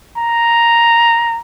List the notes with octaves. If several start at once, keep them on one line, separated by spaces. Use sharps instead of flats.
A#5